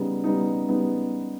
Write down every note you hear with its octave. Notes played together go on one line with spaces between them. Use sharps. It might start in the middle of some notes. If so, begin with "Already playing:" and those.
Already playing: C#3 G3 B3 D#4
C#3 G3 B3 D#4
C#3 G3 B3 D#4